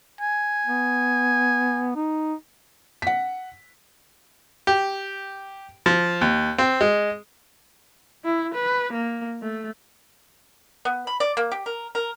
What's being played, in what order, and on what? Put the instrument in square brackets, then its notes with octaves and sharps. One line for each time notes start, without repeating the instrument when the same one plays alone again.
[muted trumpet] G#5
[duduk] B3
D#4
[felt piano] F#5 B6
[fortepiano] G4
F3
D#2
C4
G#3
[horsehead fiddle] E4
B4
A#3
A3
[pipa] B3
B5
D5
A#3
G4
A#4
A#4